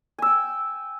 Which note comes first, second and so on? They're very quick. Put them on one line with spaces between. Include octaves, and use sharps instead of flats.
G#5 E6 G5